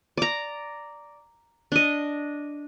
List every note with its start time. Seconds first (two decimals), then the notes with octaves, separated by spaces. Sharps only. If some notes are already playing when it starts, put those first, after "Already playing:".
0.17 D5 A#5
1.72 D4 D#5